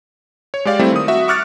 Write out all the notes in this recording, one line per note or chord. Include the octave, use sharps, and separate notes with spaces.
C#5
G#3 G4 D5 F5
G3 A3 C4 E4
D#3 D#6
F#4 E5
C#6 D6 F6 F#6 A6 C#7